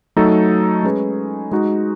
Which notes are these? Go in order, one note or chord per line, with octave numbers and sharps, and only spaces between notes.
F#3 A3 D#4 A4
G#3 C#4 G#4 B4
G#3 D#4 F#4